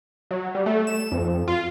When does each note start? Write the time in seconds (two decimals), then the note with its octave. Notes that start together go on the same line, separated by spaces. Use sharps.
0.31 F#3
0.55 G3
0.66 A3
0.87 E7
1.12 F2
1.48 F4